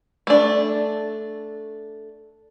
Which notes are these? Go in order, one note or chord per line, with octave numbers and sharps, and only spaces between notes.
A3 D4